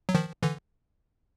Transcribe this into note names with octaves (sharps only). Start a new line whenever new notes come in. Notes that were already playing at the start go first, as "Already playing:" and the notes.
F#3
D#3 F3
D3 E3